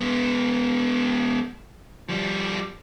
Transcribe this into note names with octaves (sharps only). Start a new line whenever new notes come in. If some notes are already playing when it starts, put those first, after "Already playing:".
G#3 B3
F3 G3